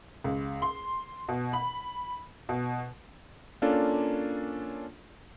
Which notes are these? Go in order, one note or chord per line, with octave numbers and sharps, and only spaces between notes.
C#2
C6
B2
B5
B2
A#3 C#4 D4 F4 A4